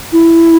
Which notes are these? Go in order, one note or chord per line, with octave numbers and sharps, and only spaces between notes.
E4